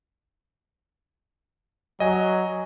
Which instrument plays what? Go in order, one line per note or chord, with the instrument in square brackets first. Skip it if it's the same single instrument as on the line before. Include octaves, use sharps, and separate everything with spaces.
[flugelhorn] F#3 [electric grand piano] D#5 G#5